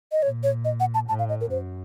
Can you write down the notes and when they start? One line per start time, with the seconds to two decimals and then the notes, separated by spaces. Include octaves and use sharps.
0.12 D#5
0.22 A#2 C#5
0.43 C#5
0.65 D#5
0.80 F#5
0.94 A5
1.08 A2 A5
1.19 F5
1.29 D#5
1.41 A#4
1.51 F#2 C5